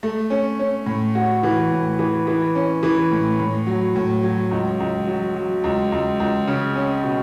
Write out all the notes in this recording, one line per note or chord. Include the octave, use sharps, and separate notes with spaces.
A3
C#4
C#4
A2
F#4
E3
A2
E3
E3
C#4
E3
A2
A2
F#3
A2
F#3
C#2
C#2
F#3
F#3
C#2
C#2
C#2
C#3
C#4
B2